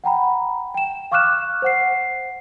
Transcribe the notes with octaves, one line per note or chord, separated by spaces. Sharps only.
F#5 G5 A#5 B5
G5 E7
F5 C#6 D6 F6 F#6 E7
C5 F#5 C7